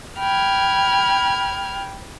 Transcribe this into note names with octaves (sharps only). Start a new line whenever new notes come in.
G5 B5 F6 G#6